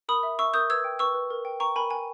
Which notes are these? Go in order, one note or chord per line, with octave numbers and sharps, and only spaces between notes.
A#4 B5 D#6
E5
E5 C#6 E6
A#4 D#6 G6
B4 E6 G#6
G5
B4 C#6 E6
B4
A#4
G5
G5 A#5 C#6
A#4 G#5 B5
G5 G#5